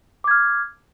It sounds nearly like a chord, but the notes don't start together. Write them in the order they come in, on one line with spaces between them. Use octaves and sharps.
D6 G#6 F6